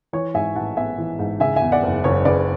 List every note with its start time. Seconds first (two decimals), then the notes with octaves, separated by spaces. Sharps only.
0.13 E3 C#5
0.34 G#2 E5 G#5
0.55 A1 F#5 A5
0.77 B3 E5 G#5
0.98 E3
1.19 G#2
1.40 C#3 E5 G#5
1.56 E5 G#5
1.62 E2
1.72 D5 F#5
1.83 F#1
2.04 F#1 C#5
2.25 C#3 B4 D5